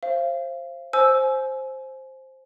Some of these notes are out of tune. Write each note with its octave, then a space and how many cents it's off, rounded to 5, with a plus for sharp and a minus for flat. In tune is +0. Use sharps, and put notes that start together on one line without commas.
C5 +20 F5 -30
C5 +10 G#5 +30 E6 +0